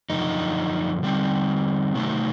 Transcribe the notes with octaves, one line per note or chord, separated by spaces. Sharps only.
F#2 D3 F3 D#4
D3 G3 C4
C3 D#3 F#3 A3